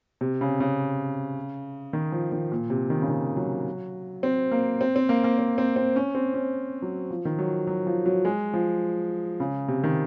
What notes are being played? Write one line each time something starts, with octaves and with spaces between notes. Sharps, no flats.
C3
C#3
C#3
D#3
F3
D#3
A#2
C3
D#3
C#3
D#3
F#3
C4
A#3
C4
C4
A#3
A#3
C4
C4
C4
C#4
C4
C#4
F#3
F3
D#3
F#3
F#3
F3
F#3
G#3
F3
C#3
C3
D#3